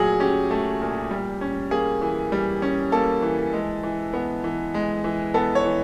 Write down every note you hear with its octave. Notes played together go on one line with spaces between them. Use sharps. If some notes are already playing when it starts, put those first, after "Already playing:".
Already playing: A#2 F#3 A3 G#4
C#4 G4
A3
A#2
G3
C#4
A#3 G#4
E3
G3
C#4
A#3 A4
E3
G#3
E3
B3
E3
G#3
E3
B3 A4
C#5
E3